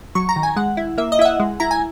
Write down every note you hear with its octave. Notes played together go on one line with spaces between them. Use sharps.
F#3 C#6
A#5
D#3
G#5
G#3 F#5
E4
A#3 E5
D#5
E4 E5
F#5
G#3
E4 A#5
G#5